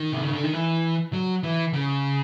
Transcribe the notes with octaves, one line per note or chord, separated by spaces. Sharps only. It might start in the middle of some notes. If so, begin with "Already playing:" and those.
Already playing: D#3
C3
C#3
D3
D#3
E3
F#3
E3
C#3